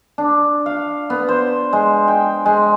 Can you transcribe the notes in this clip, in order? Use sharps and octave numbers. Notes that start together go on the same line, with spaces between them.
D4
F5
B3
C5
G#3
G5
G#3